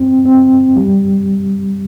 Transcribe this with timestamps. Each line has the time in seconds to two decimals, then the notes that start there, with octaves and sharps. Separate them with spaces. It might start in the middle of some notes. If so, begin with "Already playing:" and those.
Already playing: C4
0.26 C4
0.76 G3